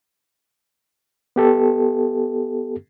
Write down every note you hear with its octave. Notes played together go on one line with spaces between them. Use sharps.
B3 G4 A4